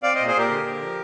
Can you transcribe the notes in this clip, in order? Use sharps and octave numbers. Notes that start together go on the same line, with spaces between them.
C4 D5 F5
A#2 C5 D#5
G#4 C5
A#2 G4 A#4
D3
D3
F3